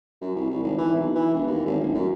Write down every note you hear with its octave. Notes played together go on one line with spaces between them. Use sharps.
F#2
C2
C2
G#1
E3
B1
E3
E1
D#2
G#1
D1
F#2